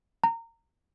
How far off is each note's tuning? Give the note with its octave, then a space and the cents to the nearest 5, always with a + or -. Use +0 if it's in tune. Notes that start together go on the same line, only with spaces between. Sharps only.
A#5 -25